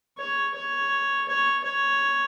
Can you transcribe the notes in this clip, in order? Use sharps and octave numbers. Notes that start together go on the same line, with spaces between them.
C#5
C#5
C#5
C#5